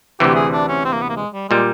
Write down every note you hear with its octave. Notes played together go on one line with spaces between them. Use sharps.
D2 C3 E3 G4
G#4
D4
C#4
C4
A#3
B3
A#3
G#3
G3
A#2 G3 G#3